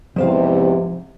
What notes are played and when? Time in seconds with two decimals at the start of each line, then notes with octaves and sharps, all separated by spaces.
0.16 E2 G#2 C3 F3 C5 F5